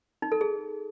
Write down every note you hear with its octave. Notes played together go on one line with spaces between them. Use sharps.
D#4
A4
G#4